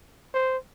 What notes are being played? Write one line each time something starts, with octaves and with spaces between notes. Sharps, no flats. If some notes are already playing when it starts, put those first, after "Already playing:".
C5